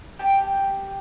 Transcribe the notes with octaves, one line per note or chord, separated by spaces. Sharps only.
G4 A5